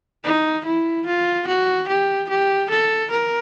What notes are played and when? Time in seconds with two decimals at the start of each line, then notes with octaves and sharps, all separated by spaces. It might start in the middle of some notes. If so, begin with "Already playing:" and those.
0.24 D#4
0.65 E4
1.06 F4
1.47 F#4
1.88 G4
2.29 G4
2.70 A4
3.11 A#4